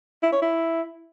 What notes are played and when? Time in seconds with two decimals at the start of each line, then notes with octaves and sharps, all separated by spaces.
0.23 E4
0.32 C#5
0.42 E4